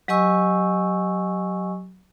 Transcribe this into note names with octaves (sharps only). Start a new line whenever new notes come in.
F#3 G4 D#5 G#5 C#6 E6